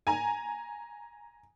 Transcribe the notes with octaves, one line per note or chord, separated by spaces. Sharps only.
G#5 A#5